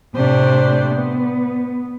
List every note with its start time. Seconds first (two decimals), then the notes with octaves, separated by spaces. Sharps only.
0.14 A2 C3 A3 D4 C5 D5
0.93 B3